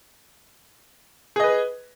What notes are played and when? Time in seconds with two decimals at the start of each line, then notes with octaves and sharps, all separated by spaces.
1.36 G#4
1.40 D#5
1.43 B4